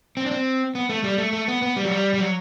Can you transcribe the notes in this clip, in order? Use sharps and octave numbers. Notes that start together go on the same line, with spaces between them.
C4
D4
C4
B3
A3
G3
A3
A3
B3
B3
G3
F#3
G3
G3
F#3